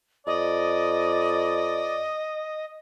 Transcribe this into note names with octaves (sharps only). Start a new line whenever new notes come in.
F2 D5 D#5